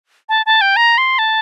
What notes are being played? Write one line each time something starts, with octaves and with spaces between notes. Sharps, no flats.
A5
A5
G5
A#5
C6
A5